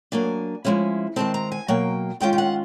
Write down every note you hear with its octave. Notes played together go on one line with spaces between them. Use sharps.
F#3 A#3 D4 G#5
F3 G#3 C#4 E4
D#3 G#3 C4 A5
A#5
G#5
B2 F#3 A#3 G5
D#3 G#3 C#4 F4 G5
G5
F#5